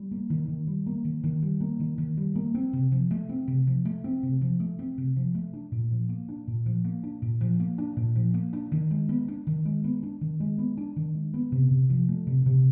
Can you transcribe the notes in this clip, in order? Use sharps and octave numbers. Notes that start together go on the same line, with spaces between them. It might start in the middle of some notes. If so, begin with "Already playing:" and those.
Already playing: G3
A#3
D#3
D#3
G3
A#3
D#3
D#3
G3
A#3
D#3
D#3
G3
A#3
C4
C3
F3
A3
C4
C3
F3
A3
C4
C3
F3
A3
C4
C3
F3
A3
D4
A#2
F3
A#3
D4
A#2
F3
A#3
D4
A#2
F3
A#3
D4
A#2
F3
A#3
D4
D#3
G#3
B3
D4
D#3
G#3
B3
D4
D#3
G#3
B3
D4
D#3
G#3
B3
C3
C3
F3
A3
C3
C3